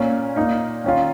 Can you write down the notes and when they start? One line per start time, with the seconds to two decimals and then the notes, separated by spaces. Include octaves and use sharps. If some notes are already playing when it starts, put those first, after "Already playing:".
Already playing: A#2 A#3 C#4
0.36 A#2 A#3 D#4
0.84 D#3 C#4 F4